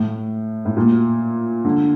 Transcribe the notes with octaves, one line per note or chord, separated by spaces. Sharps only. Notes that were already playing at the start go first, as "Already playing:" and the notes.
Already playing: A2
A2
A#2
D3